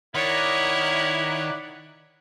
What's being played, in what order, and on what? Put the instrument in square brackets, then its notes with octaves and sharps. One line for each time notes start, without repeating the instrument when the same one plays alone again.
[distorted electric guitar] D#3 [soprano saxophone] E4 [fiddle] C#5 [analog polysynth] D5 F#5